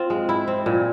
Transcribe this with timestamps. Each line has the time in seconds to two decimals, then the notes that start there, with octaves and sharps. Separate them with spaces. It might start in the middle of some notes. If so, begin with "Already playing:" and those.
Already playing: C4 F4
0.10 G#3
0.29 E4
0.48 C4
0.66 A#2